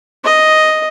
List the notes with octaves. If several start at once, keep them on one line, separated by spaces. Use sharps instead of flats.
D#5